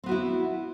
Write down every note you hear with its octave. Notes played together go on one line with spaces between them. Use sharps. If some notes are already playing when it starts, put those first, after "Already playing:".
B3 C4 E4 F#4